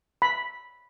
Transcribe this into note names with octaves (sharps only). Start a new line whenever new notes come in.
B5